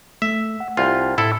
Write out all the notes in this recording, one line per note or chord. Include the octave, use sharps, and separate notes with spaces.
A3 E5
F#5
C2 F4
A2 E4 A4